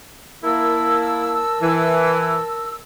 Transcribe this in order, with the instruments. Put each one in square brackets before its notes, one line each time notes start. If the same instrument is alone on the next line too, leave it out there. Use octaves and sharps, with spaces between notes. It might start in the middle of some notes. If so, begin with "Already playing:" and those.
[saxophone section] A#3 E4 [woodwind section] A#4 A5 E6
[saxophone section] E3